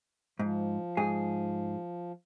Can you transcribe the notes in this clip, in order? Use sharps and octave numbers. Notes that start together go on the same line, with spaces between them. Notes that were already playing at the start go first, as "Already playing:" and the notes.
G#2 F3
G#2 G#4